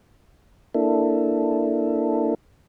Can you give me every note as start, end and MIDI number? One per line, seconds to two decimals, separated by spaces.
0.74 2.35 58
0.74 2.35 62
0.74 2.35 64
0.74 2.35 69